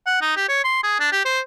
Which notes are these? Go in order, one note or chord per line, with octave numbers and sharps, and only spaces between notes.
F#5
D#4
G4
C#5
C6
G#4
D4
G4
C5